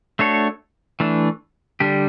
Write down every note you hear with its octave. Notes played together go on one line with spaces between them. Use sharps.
A3 D4 F#4 A4 C#5
E3 A3 D4
D3 G3 D4 G4